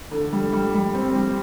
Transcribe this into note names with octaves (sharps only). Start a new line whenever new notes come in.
D3
G3
G3
G3
C4
G3